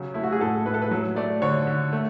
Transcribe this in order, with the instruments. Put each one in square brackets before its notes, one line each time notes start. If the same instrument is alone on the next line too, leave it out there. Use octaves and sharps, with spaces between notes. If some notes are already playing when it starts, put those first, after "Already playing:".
Already playing: [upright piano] C#3 F#3
A3 E4
F#4
G#4
A2 A4
A2 B4
A4
B4
F#3
A3 D5
D3 C#5
D3
A3